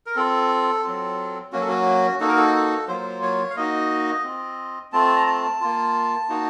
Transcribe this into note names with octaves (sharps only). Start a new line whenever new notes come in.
A#4
C4 F4 A4
F#3 C4 F4
F#3 A#3 C#4 F#4
A4
F#4
A#3 D#4 F#4 A4
A#4
A4
A4
F#3 A#3 F4 C5
C#5
F5
A#3 D#4 F#4 D#5
C4 F4
A3 C4 F4 A5
A#5
A5
A#3 F4
A#3 D#4 F#4